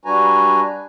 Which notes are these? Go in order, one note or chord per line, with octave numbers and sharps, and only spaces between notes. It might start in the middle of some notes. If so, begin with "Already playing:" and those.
G3 D4 F#4 B4 G#5 A#5